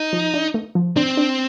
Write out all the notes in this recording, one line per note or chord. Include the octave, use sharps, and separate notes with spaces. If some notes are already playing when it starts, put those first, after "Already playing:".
Already playing: D#4
F3
D4
A3
F3
C4 D4
D4